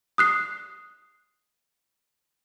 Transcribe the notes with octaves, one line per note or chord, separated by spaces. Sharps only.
D#6 F#6 C7